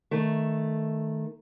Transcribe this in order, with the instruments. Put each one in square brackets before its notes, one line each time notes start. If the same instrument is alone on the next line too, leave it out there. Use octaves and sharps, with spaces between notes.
[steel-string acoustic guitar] D#3 A3